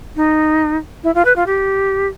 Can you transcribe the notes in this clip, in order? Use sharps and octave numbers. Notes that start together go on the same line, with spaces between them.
D#4
E4
F4
B4
F4
G4